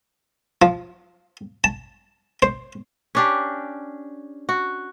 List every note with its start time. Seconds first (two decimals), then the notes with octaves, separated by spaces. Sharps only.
0.62 F3
1.64 A5
2.42 C5
3.15 C#4 D4 G4
4.49 F#4